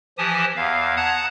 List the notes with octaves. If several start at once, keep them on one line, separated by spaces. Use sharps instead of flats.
E3 F3 G4 G#5 A5 D#6
E2 F5
F#5 A5 A#5 D#6 F#6 G#6